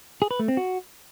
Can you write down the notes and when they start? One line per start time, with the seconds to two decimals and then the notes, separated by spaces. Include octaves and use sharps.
0.22 G#4
0.31 B4
0.39 A3
0.48 C4
0.57 F#4